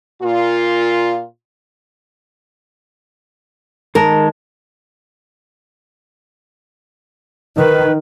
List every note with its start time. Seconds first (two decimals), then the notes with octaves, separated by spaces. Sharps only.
0.22 A#2 F4
3.95 D#3 G#3 A#4 A5
7.58 D#3 B4